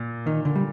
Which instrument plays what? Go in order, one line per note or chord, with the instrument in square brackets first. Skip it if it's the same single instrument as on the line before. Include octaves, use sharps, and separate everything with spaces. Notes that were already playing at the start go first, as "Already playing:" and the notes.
Already playing: [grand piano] A#2
[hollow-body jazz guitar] D#3
D3
G3